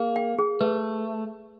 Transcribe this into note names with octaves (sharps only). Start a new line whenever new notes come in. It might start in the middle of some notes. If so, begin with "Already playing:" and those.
Already playing: A#3 G#4
G5
G#4
A3 B4